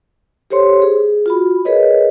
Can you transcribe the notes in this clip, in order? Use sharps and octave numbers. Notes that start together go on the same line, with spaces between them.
G4 A4 C5 C#5 C6
G#4
F4 F#4 B5
G#4 A#4 B4 C#5 D#5